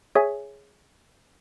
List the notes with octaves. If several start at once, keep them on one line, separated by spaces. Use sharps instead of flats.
G#4 C#5 E5 G#5